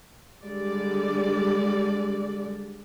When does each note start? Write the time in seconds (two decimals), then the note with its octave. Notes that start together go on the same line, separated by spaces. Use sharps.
0.44 D3 G3 G#3 D5